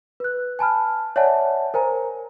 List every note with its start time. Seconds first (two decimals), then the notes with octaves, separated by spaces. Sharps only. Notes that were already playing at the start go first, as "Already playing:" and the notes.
0.20 B4 F#6
0.59 G#5 A5 B5 F6
1.16 C#5 D5 E5 F#5 G#5 A5
1.74 A#4 C5 G#5 A#5